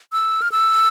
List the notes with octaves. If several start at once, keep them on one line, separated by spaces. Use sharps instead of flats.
E6
F6
E6